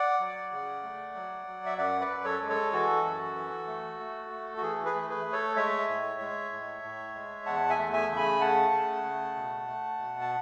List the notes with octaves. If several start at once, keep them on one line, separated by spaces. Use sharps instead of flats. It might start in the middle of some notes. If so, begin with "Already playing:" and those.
Already playing: D5 F#5
F#3
C#3
A3
F#3
F#3
E5
F#2 D5 F#5
B4 D5
F#2
A4 C#5
G#3
A4 C#5
E3 F#4 A4
F#2
E3
A3
A3
A3
F#4
E3 G#4
G#4 B4
A3
G#4 B4
A3
A4 C#5
G#3 C#5 E5
A2
G#3
A2
A2
G#3
E2 F#5 A5
E5 G#5
A3
E5 G#5
C#3
G#5 B5
A3 F#5 A5
C#3
A3
B2
A3
B2
A5